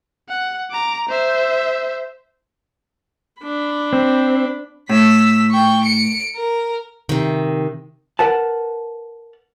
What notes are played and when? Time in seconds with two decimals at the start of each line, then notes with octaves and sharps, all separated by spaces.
0.29 F#5
0.71 A#5 D6
1.09 C5 E5
3.42 D4 B5
3.93 C4
4.89 A2 E6 B6
5.51 G5 C#6
5.83 C#7 D7
6.36 A#4
7.09 C3 D#3
8.19 A#4 B4 F#5 A5